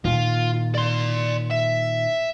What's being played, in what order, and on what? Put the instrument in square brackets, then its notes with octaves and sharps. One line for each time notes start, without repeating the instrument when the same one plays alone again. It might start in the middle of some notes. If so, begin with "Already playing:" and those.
[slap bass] A#2 D#3 [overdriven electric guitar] F4
[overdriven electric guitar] D5 C6
E5